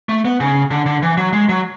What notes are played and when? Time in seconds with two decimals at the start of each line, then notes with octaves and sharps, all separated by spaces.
0.09 A3
0.25 B3
0.40 C#3
0.71 D3
0.86 D3
1.02 E3
1.17 F#3
1.33 G#3
1.49 F#3